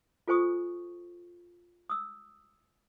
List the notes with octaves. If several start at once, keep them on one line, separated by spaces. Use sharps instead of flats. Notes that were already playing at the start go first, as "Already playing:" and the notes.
F4 A4 C5 G#5 C#6 D#6
D#6 E6